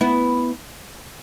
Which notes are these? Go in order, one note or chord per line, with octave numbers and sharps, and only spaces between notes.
B3 E4